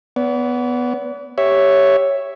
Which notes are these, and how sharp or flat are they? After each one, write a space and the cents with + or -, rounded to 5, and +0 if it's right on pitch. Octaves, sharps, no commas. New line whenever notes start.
B3 +0 D5 -45
G4 +0 C#5 +0 E5 +0